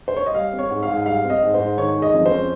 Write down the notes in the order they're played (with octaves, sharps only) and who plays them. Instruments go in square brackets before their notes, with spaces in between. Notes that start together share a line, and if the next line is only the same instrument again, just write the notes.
[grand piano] C5
C#5
D#5
G3 F5
C4
C#5
G#2
F5
G#2
G3 F5
C4
D#5
G#2
C5
G#2
D#3 C#5
G#3
D#5
F2
C5
C#4